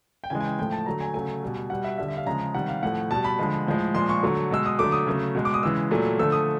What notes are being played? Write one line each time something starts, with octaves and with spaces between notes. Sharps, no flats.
G5
C#3 E3 G#3 G#5
G#5
G5
A2 F3 A3 G5
A5
D3 F#3 A3 A#5
G#5
C#3 F#3 A3 G#5
B2 G3
B2 G3 F#5
E5
D3 G3 E5
E5
F5
C#3 F3 G#3 A#5
C3 D#3 G3 F#5
F5
A2 F3 A3 F#5
B2 G3 A5
B5
D3 F3 G#3
A2 F3 G#3
A#2 F3 G#3 C6
C#6
D3 F#3 A3
B2 G#3 E6
D#6
D3 F#3 A3 D6
D#6
C#3 F#3 A3
B2 G#3
D6
D#6
C#3 E3 G#3 E6
A#2 F#3 A3
D3 F3 A3 E6
D#6